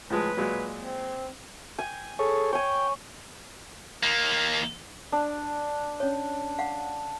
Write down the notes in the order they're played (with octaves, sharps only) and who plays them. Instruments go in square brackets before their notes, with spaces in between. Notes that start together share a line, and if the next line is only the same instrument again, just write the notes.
[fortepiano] A2 F3 G#3 [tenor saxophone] B4
[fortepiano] A#2 F#3 G#3
[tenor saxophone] C4
[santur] G5 G#5
[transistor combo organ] G#4 A4 C#5
[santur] C#5 G#5 [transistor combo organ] G5
[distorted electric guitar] D#3 A#3
[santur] D4
[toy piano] C#4 C#5
F5 F#5